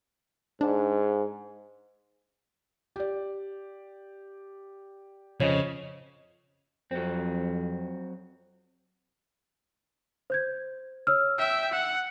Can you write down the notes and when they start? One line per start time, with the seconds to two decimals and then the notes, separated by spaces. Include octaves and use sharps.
0.61 G#2 D4
2.96 G4 D5
5.40 F2 C#3 C#5 D#5
6.91 F2 F#3 C4
10.30 C5 G6 G#6
11.07 C#5 E6 F6
11.39 E5 G5 E6
11.71 F#5